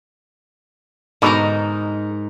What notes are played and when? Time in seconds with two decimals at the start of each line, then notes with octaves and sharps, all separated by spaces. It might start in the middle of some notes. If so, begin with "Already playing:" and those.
1.22 G#2 B2 D3 D#4 A#4